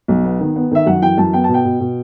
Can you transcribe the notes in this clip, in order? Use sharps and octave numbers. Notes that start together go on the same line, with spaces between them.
B1
B3
D#3
B3
D#3 E5
F#2 F#5
E3 G5
F#2 A5
B3 G5
B2 A5
G5
B2
B2